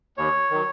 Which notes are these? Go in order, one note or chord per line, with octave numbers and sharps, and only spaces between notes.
D#2 C#5
D#3 F#3